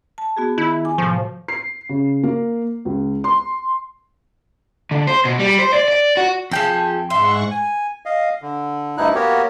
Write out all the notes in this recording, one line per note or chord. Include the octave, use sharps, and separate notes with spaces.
A5
B3 F#4 G#4
D#3 E4
G#5 D6
A2 C3 F3
C7
C#3
A#3
C#2
C6
D3
C5
B2
G3
C5
D5
D5
F#4
F2 F3 G#4 A4 G5
G#2 E5 F#5 C6 C#6
G#5
D#5 F5
D3
D2 G2 D#4 E4 F#6
A#3 B3 F#4 G4 A#4 C#5